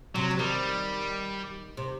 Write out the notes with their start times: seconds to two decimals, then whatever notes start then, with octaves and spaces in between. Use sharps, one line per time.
0.15 C3 F#3
0.31 C3
0.39 D#3 G3
1.77 C3